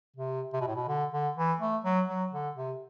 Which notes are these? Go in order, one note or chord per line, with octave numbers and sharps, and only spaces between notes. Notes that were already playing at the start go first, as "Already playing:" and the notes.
C3
C3
B2
A2
B2
D3
D3
E3
A3
F#3
F#3
D3
C3